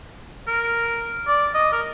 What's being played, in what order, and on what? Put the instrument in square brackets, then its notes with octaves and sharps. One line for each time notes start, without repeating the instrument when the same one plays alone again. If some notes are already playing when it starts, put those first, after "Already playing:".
[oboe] A#4
D5
D#5
A#4